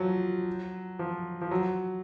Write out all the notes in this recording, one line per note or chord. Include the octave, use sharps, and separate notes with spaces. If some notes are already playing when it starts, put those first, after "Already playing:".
Already playing: F3 F#3
F3
F3
F#3